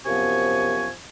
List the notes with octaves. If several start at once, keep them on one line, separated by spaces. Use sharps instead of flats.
F#2 C3 F3 B3 G#5 C#6